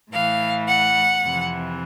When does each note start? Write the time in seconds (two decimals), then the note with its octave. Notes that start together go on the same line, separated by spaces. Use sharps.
0.11 A2 E3 F5
0.66 F#5
1.21 F2 C3 E3